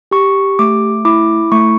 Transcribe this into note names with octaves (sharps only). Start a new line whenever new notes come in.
G4 C#6
A3 D6
E4 D6
A3 C#6